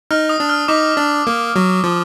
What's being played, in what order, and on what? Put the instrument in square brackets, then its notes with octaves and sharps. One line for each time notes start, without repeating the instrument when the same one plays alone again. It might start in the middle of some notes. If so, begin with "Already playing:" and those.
[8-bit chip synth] D#4 [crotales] F6
[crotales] D#6
[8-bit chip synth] D4
[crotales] F6
[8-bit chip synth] D#4 [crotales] D6
[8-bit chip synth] D4
A#3
F#3
F3